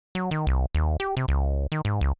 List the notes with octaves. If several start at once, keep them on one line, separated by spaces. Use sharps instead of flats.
F#3
D#3
C2
D#2
G4
C3
C#2
D#3
G#2
C#2